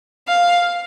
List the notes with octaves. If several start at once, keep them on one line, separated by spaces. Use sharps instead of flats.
F5